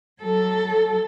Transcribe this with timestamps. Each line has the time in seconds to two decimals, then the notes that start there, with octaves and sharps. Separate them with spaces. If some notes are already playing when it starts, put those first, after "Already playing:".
0.22 F#3 A4